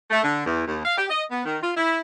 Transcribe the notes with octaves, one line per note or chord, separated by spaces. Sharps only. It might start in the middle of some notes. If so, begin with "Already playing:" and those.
A3
D3
E2
D#2
F5
G4
D#5
B3
D#3
F4
E4